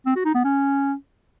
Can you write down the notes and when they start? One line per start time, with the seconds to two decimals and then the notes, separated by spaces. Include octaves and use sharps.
0.06 C4
0.15 F#4
0.25 D#4
0.34 B3
0.44 C#4